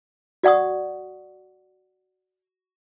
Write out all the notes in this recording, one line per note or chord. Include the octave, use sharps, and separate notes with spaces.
F#4 D5 F#5 C#6 D#6